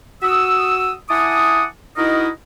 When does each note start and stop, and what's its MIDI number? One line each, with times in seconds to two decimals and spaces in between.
0.23 0.92 66
0.23 0.92 87
0.23 0.92 88
1.09 1.64 64
1.09 1.64 78
1.09 1.64 80
1.09 1.64 81
1.09 1.64 86
1.09 1.64 87
1.96 2.27 63
1.96 2.27 64
1.96 2.27 66
1.96 2.27 70
1.96 2.27 75